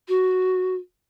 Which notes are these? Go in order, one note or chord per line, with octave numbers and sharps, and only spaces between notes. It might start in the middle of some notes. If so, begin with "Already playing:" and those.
F#4